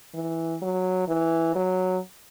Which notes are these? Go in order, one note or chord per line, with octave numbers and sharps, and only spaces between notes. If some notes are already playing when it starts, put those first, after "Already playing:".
E3
F#3
E3
F#3